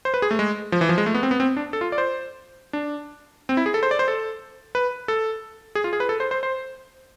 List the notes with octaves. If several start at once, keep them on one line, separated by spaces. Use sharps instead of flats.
C5
B4
G#4
A3
G#3
F3
E3
F3
G#3
A3
B3
C4
B3
C4
D4
A4
F4
D5
C5
D4
C4
E4
G#4
A4
C5
D5
C5
A4
B4
A4
G#4
F4
G#4
B4
A4
C5
C5
C5